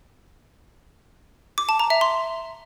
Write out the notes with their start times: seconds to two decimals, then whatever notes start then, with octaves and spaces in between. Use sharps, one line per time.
1.58 D6
1.69 A5
1.80 A#5
1.90 E5
2.01 C6